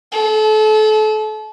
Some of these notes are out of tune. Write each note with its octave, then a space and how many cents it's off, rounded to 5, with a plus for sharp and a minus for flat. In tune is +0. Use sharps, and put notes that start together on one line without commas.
A4 -35